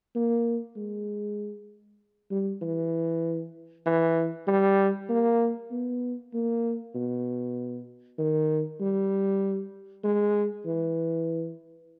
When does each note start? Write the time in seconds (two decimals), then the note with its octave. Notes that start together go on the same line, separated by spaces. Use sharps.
0.15 A#3
0.76 G#3
2.31 G3
2.62 E3
3.86 E3
4.47 G3
5.09 A#3
5.71 B3
6.34 A#3
6.95 B2
8.18 D#3
8.81 G3
10.04 G#3
10.65 E3